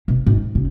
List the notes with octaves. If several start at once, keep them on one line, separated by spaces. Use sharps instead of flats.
B2
G#2
C#3